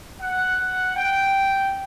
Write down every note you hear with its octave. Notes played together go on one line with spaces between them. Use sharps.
F#5
G5